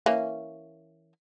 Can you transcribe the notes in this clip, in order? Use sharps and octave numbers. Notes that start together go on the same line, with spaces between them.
E3 A#3 C#4